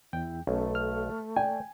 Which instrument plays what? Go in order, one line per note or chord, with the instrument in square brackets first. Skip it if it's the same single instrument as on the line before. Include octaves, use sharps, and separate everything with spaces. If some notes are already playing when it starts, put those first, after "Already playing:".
[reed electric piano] E2 G5 [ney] E4
[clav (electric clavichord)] B1 [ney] A3 [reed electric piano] C#4
[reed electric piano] F6
[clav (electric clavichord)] D5 [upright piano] G5 [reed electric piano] G#5